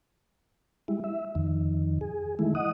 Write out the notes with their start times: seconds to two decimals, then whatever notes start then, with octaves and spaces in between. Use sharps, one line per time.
0.88 G3 G#3 E4
1.04 E5
1.35 F2 D#3
2.01 G#4
2.39 D#3 E3 G#3 A3 E4
2.55 D#5 F#5 D#6